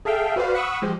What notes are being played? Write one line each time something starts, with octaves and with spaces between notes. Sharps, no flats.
G#4 A4 E5 F5 G5
F#4 B4 C5 D5 F5
F#5 B5 C#6 D#6 E6
F3 G#3 G4 C5